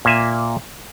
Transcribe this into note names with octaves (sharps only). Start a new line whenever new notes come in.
A#2 A#3 E5 G#5